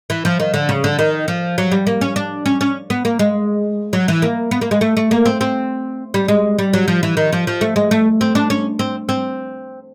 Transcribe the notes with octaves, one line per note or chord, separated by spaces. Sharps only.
E3
F3
D#3
D3
C#3
D3
D#3
F3
F#3
G3
A#3
C#4
D4
C#4
C#4
B3
A#3
G#3
F#3
E3
A#3
B3
A#3
G#3
A3
A3
A#3
C4
C4
G3
G#3
G3
F#3
F3
E3
D#3
F3
F3
A3
G#3
A3
C4
D4
C#4
C4
C4